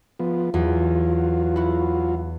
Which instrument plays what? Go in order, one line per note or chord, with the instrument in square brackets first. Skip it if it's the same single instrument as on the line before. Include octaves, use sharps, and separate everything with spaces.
[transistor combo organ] F3 B3
[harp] E2 [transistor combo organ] F#3 F4
[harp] E4 F#4